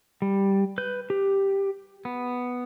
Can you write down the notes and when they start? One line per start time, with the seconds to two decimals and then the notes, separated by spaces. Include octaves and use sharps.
0.22 G3
0.78 B4 G6
1.10 G4
2.05 B3